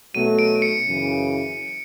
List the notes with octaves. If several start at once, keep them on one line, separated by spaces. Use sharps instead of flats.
B1 B2 F#3 A3 D#7
D7
C#7
F#2 C#3 E3